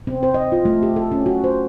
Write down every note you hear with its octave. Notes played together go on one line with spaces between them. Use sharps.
C4
C5
D#5
F4
A3
G4
A4
C#4
F#4
C5